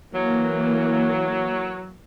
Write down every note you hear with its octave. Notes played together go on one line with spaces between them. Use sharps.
E3 F#3 A#3